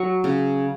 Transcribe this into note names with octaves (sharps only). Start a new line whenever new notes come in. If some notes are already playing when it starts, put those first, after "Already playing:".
Already playing: F#3 C#6
C#3